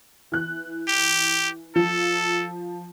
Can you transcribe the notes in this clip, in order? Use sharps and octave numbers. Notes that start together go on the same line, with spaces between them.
E3 F#6
G4
F3 A4